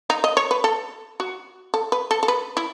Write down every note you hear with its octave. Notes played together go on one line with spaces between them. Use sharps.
D#4
D#5
C#5
B4
A4
F#4
A4
B4
A4
A4
B4
E4